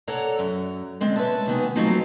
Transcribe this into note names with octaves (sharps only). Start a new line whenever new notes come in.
A4 C#5 D5 F#5 A#5
F#2
D3 G#3 C4
B4 C#5 E5 A5
F#2 D#3 B3 G#4
F3 F#3 A3 C4 D#4 F4